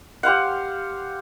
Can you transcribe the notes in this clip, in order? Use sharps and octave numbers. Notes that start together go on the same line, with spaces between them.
G4 C5 F5 F#5